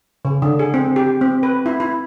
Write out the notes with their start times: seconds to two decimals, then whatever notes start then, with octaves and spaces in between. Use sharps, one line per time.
0.25 C#3
0.42 D3
0.59 G#4
0.74 C4
0.96 G4
1.21 C4
1.43 B4
1.66 E4
1.80 E4